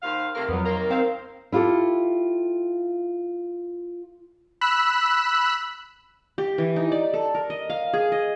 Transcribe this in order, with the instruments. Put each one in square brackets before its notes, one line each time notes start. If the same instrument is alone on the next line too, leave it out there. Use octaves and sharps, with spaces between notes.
[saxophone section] D#2 C5 F5
[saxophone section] C3 A3 A#3 [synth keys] F6
[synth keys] F2 F#3 [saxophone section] B3
[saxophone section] C3 D#3 A#3 [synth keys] A#5 C6
[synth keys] C4 C5 F5
[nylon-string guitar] E4 F4 G4 A4
[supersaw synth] B5 E6 F#6
[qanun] G4
E3
D#4
D5
A4
A#4
D#5
F5
G#4
D#5